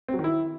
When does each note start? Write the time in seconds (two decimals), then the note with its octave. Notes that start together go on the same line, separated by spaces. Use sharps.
0.08 C4
0.14 F#3
0.19 D#3
0.24 E4